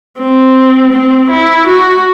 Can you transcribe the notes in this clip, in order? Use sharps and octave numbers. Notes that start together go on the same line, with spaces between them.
C4
C4
E4
F#4